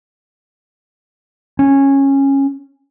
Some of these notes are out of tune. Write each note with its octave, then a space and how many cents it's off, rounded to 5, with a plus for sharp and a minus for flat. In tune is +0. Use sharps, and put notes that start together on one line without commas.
C#4 -15